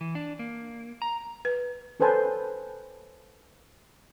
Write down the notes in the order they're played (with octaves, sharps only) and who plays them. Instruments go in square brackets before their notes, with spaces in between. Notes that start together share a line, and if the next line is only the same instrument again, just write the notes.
[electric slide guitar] E3
D4
A#3
A#5
[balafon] B4
[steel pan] C#4 A4 B4 C5 G#5 A5